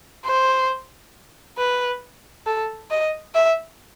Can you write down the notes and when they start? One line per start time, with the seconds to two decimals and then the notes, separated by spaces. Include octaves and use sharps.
0.26 C5
1.58 B4
2.46 A4
2.91 D#5
3.35 E5